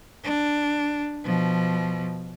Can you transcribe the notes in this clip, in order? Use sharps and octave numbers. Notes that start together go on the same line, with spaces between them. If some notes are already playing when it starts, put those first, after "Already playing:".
D4
B2 F3